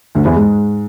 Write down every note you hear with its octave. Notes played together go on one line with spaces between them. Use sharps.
D2 D3
E2 E3
G#2 G#3